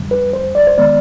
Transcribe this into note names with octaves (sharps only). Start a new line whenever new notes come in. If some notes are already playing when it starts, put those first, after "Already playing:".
Already playing: F2 D3 G3
B4
C5
D5
C5
D#3 G#3 B3 D5